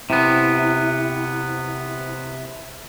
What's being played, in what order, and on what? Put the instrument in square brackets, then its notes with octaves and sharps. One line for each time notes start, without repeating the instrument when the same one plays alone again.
[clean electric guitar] C3 B3 [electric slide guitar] E4